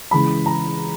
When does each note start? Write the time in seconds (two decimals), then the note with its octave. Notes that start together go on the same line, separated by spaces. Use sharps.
0.11 C#2 C#3 E3 B5
0.46 A#5